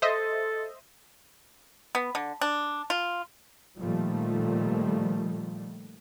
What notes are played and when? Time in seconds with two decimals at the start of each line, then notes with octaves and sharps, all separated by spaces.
0.02 A4 C5 D#5 E5
1.95 B3
2.15 D3
2.41 D4
2.90 F4
3.79 A#2 D#3 F3 G3 A3